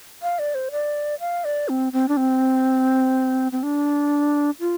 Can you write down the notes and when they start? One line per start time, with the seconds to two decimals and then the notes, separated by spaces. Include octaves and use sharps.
0.22 F5
0.39 D5
0.55 C5
0.71 D5
1.20 F5
1.45 D5
1.69 C4
1.93 C4
2.09 D4
2.17 C4
3.52 C4
3.63 D4
4.60 F4